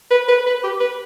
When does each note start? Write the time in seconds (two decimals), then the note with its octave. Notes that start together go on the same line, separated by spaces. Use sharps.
0.11 B4
0.28 B4
0.46 B4
0.64 G4
0.80 B4